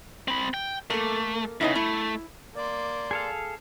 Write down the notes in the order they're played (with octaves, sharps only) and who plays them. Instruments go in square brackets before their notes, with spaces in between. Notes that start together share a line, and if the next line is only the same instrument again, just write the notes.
[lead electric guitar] C4 B5
G5
[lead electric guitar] A3 [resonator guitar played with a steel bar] A#3 A4
[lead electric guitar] E2 C#3 [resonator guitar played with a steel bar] B3 D#4 E4
[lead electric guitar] A3 [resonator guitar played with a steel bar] E4
[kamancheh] A#3 C6 [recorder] D5
[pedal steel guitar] G#4 A4 F5